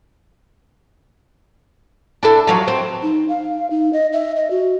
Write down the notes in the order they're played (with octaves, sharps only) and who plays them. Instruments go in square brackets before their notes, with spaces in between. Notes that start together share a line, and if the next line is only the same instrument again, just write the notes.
[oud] D4 E4 A4
F3 F#3 F5
C4
[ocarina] D#4
F5
D#4
D#5
E5
D#5
F#4